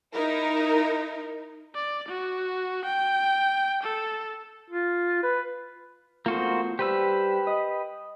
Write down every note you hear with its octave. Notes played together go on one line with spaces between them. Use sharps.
D#4 E4 A#4
D5
F#4
G5
A4
F4
B4
E2 A3 A#3 F4 F#4 C5
G3 G4 B4 C5 E6
D#5